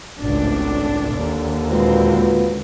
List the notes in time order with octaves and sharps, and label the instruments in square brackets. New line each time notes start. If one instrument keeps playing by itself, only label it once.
[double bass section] G#1 C#2 A2 [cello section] D4
[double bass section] D#2 D3
[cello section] A#2 G#3 C4 [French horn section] F4 F#4 B4